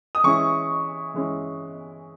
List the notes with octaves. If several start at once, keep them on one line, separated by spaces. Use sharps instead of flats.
D#6
E3 G#3 C#4 E4 C#6
E3 G#3 C#4 E4